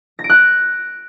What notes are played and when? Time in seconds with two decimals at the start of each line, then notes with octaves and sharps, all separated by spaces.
0.19 A#6
0.24 D7
0.30 F#6